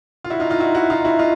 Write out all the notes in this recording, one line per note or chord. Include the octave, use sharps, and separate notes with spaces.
F4
E4 F#4
D#4 F4
D#4 F4
E4 F#4
E4 F#4
D#4 F4
E4 F#4
D#4 F4